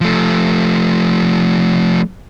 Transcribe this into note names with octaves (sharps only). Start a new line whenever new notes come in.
F3 A3